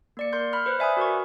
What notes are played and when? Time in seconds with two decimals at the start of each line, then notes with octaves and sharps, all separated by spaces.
0.17 A#3 D5 C#7
0.33 A#4 C6 G6
0.53 B5 F6
0.66 B4 C5 F#6
0.79 D5 E5 G#5 B5 D#6
0.97 F#4 A#4 B4 C#6